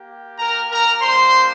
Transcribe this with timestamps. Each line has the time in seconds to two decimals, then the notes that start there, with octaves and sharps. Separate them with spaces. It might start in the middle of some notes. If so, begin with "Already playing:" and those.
Already playing: A#3 G4
0.39 A#4 A#5
0.70 A#4 A#5
1.01 G3 A#3 D4 C5 C6